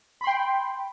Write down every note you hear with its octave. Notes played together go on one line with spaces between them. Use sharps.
G5 B5 C6